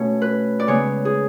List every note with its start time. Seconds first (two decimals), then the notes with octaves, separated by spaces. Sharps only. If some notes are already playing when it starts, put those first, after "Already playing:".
Already playing: B2 A3 C#4 C#5
0.22 B4
0.60 D5
0.67 C#3 G#3 B3 C#5
1.05 G#4